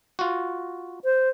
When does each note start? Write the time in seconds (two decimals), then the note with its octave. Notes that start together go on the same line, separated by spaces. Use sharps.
0.19 F4 F#4
1.04 C5